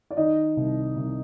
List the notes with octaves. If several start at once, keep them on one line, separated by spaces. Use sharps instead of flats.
D5
D#3 D#4 D#5
C2
C2